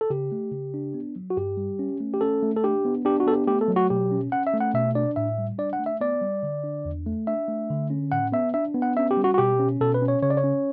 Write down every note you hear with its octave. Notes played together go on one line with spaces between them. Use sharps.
A4
C#3 G4
A3
C#3
D4
B3
F#3
F#4
G2 G4
G3
C#4
A3
G4
C#4 A4
A3
A4
D4 G4
B3
D4 G4
F#4
B3 A4
G4
A3 G4
A4
F#3
F#4
B2 G4
C#4
C#4 F#5
E5
A3
F#5
B2 E5
D4 D5
A2 E5
G3
D4 D5
F#5
A3
E5
B3 D5
G3
D3
D4
E2
A3
D4 E5
A3
D3
C#4
A2 F#5
B3 E5
D4 E5
B3
F#5
C#4 E5
G4
G3
F#4
F#4
B2 G4
C#4
B2 A4
B4
C#4
C#5
C#3 C#5
D5
C#5
C#4